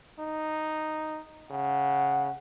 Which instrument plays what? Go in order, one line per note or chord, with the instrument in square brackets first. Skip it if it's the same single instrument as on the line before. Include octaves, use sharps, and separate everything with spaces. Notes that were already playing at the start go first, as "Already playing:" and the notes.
[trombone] D#4
[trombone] C#3 [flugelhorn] F#5